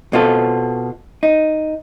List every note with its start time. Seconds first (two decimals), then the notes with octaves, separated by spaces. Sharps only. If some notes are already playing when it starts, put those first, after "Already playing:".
0.13 B2 C4 F4 A4
1.23 D#4